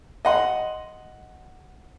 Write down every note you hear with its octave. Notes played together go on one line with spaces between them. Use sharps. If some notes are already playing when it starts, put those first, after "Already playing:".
D#5 F#5 C6